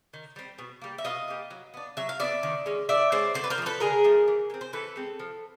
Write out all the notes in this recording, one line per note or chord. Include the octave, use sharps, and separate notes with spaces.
D#3
G3 C4
B2
G3 A#3
E5
B2 D#5 F5
G3 A#3
F#3
B3 D4
F#3 E5
F5
B3 D4 D5 E5
D#3
G#3 C#4
D#3 D5 E5
G#3 C#4 C5 D5
D3 C5 D5
B4
A#4 C5
F3 A3
A4 B4
D3 G#4 A#4
F3 A3
E3
G#3
C4
C5
E3 A4 B4
G#3 C4
F3